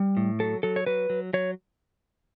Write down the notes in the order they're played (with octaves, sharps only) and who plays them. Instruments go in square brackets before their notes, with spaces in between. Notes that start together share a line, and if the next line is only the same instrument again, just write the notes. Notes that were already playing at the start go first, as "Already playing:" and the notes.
Already playing: [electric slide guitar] G3
A2
F#3 A4
F#3 A4
C#5
F#3 B4
F#3
F#3 C#5